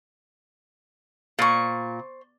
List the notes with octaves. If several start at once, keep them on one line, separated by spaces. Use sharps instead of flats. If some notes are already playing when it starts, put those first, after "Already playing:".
A#2 C5 C#6